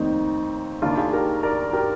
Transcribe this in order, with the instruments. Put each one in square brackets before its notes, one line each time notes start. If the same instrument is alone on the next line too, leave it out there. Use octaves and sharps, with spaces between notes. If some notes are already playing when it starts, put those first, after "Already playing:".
Already playing: [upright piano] F1 D#2 D#3 C4 D#4
D#2 D#3 D4 F4
F4 G#4
G4 A#4
A#4 D5
G4 A#4